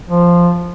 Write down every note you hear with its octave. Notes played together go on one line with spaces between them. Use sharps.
F3